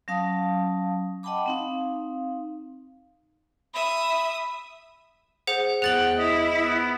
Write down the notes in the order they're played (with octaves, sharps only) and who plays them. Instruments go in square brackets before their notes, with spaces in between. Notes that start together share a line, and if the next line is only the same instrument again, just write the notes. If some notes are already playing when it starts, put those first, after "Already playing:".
[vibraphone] F#3 C#4 F5 A5 D#6
D#5 F#5 G5 A5 B5 D6
C4 D#4 F5
[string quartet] E5 D#6 [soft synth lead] B5
[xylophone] G#4 C5 F#5
[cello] E2 G5 [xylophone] G#4 A6 F#7 [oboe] F#5
[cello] E4 [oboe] D#5
[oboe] B3